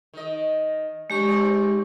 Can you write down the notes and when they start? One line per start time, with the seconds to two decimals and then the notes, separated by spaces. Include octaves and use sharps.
0.14 D#3 D#5
1.10 F#3 G#3 D4 G4 C#6
1.27 G#2 C4 D5